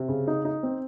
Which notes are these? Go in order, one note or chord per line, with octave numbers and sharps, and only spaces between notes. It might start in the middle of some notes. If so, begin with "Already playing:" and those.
Already playing: C3
C#3
D#4
D#4
C4